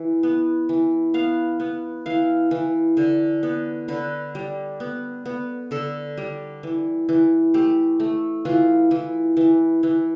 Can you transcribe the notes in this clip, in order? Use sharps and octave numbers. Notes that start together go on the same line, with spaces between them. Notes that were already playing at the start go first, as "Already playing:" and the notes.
Already playing: E3
B3
E3
B3 F5
B3
E3 F5
E3
D3
B3
D3 B4
G3
B3
B3
D3 A4
G3
E3
E3
A3 G4
A3
E3 F4
E3
E3
E3